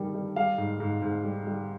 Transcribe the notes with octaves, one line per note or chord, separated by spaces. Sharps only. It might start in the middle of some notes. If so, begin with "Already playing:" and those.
Already playing: G2 D#3 G3
G3
G3 F5
G#2
G#2
G#2
G3
G3